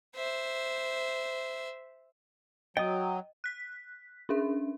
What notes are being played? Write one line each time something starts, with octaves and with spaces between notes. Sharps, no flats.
C5 E5
F#3 D#5 G5 D#6
F#6 B6
C#4 D4 G#4 E5